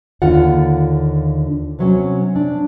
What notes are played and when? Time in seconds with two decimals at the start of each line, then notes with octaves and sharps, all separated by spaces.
0.22 D#2 D3 F4 F#5
1.79 C3 F#3 C#4
2.36 D4